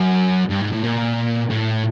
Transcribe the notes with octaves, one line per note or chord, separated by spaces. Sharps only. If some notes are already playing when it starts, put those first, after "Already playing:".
Already playing: F#2
G2
G#2
A2
A#2
A2